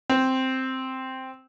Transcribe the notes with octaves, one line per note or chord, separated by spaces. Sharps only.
C4